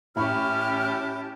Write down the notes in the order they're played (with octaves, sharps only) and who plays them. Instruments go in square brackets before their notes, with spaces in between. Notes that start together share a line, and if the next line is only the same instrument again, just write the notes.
[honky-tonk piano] A1 B5 C#6 [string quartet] C#4 G4 A5 [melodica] E4 [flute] F6